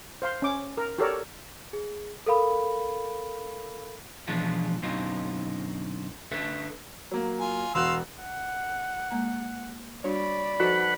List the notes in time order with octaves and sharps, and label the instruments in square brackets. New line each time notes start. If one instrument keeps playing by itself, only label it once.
[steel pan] C5 F5 C6
C#4 D6
A#4
F#4 G4 A4 A#4 C#5 D5
[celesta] G#4
A4 A#4 F5 B5
[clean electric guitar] B2 E3 F3 G#3 D4 F4
F#2 B2 D3 C4 D#4 F4
D3 A4 B4 E5
[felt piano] F#3 A#3
[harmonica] F4 G#5
[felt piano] E1 F#4 F#6 [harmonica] F5 C6 E6
[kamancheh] F#5
[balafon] G#3 A#3 A#5
[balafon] G3 D4 F#4 [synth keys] C#5 [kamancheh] D5 B5
[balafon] F3 C5 [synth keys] D#4 F#4 A4 [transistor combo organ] B4 F#5